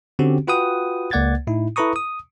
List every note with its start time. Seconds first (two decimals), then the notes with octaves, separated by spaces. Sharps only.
0.19 D3 C4 C#4 F#4 G4
0.47 F4 F#4 B4 F#5 G5 D#6
1.11 C#2 A#3 D5 F#5 G#6 A6
1.47 A2 D#4 E4
1.76 E4 A4 B4 A#5 C#6 D#6
1.96 D#6